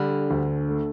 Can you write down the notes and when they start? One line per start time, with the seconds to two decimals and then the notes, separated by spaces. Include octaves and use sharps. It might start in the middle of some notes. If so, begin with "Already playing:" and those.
Already playing: D3 G3
0.30 D2
0.69 A3